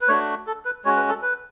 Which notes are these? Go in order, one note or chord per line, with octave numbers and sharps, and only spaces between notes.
B4
A3 D4 F#4 C#5
A4
B4
G#3 C#4 F#4 C#5
B4
A4
B4